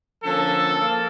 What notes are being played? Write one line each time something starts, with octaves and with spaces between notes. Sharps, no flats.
D3 F3 A#3 C#4 A4
F3 A#3